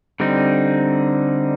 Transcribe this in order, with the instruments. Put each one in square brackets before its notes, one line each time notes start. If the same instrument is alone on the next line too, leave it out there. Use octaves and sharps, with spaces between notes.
[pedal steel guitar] D3 G3 C4 D#4